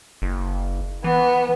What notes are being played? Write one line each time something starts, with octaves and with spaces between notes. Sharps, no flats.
F#1
E3 B3